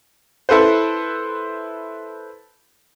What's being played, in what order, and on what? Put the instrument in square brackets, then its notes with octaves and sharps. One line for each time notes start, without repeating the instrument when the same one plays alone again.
[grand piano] E4 A4 B4 C5